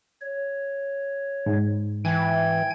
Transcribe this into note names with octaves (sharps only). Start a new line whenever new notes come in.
C#5
G#2
E3 G5 G#5 G#6